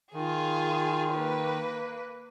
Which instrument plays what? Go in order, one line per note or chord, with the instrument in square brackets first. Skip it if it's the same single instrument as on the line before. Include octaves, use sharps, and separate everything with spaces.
[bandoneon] D#3 [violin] F4 G#4
[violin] A#3 B4